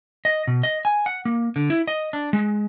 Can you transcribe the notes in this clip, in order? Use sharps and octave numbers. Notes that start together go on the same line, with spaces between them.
D#5
B2
D#5
G#5
F#5
A#3
D3
E4
D#5
D4
G#3